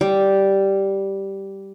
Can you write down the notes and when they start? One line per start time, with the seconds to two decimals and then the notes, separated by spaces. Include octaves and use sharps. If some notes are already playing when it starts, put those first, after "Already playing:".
0.01 G3